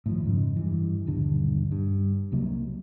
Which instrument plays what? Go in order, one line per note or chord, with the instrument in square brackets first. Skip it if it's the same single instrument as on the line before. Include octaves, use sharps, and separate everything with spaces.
[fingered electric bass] A2 D#3 F3
F2 G#2 C#3
G2 E3
D#1 B1 G2 D3
G2
C2 C3 F#3 A#3